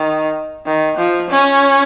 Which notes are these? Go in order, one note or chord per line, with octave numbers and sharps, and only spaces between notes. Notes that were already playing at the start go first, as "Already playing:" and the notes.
Already playing: D#3
D#3
F3
C#4